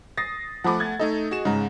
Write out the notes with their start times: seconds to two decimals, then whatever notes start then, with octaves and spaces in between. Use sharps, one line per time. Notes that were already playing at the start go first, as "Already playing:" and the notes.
0.17 D#6 A6 A#6 C7
0.64 F3 A3 F#5 B5 D6
0.80 G#6 A6
0.99 A3 D#4 A4 D#5
1.31 F#4 G#4 E7
1.45 G#2 C#3 A#5